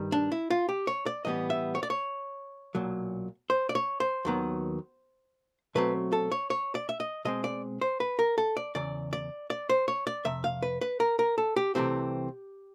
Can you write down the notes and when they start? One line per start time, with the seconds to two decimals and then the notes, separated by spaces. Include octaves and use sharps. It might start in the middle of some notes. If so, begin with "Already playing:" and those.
Already playing: G2 D#3 G3
0.12 D4
0.32 E4
0.50 F4
0.69 G4
0.87 C#5
1.06 D5
1.25 A2 E3 G3 B3 D#5
1.50 E5
1.75 C#5
1.83 D5
1.90 C#5
2.75 B1 A#2 F#3
3.50 C5
3.69 D5
3.75 C#5
4.00 C5
4.25 D#2 D#3 F#3 B3
5.75 B2 F#3 A3 C4 B4
6.13 A4
6.32 C#5
6.50 C#5
6.75 D5
6.89 E5
7.00 D#5
7.25 B2 G#3 C4 D#5
7.44 D5
7.81 C5
8.00 B4
8.19 A#4
8.38 A4
8.57 D5
8.75 E2 C#3 D5
9.13 D5
9.50 D5
9.69 C5
9.88 C#5
10.07 D5
10.25 F2 C3 E5
10.44 F5
10.62 B4
10.81 B4
11.00 A#4
11.19 A#4
11.38 A4
11.56 G4
11.75 C2 C3 E3 A3 C4 G4